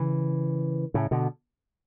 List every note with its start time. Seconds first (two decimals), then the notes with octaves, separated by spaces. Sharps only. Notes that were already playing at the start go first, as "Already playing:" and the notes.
Already playing: C#3 E3
0.94 A2 C#3
1.11 B2 D3